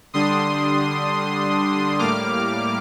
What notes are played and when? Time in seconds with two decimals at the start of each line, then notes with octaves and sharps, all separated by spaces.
0.13 D3 G3 D4 C6 D#6
1.99 A2 G3 A#3 D6 F6